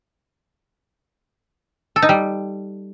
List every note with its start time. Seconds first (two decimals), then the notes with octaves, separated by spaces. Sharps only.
1.96 A4
2.02 D#4
2.09 G3